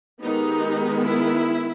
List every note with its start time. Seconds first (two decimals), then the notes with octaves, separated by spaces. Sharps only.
0.20 D#3 G#3 B3 D#4 G4
1.04 E4